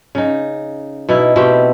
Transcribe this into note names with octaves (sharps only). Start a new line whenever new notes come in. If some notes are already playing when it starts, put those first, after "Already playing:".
C#3 D#4
B2 D#4 E4
B2 A3 C4 G4